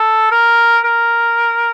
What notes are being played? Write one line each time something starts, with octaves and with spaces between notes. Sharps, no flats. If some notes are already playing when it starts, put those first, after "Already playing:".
Already playing: A4
A#4
A#4